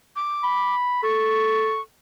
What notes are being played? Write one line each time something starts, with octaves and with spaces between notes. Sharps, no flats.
D6
B5
A4 C#6